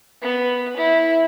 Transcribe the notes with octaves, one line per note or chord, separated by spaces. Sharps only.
B3
E4